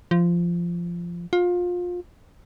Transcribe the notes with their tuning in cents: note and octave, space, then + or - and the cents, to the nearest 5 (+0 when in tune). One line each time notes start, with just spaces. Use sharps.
F3 -15
F4 +25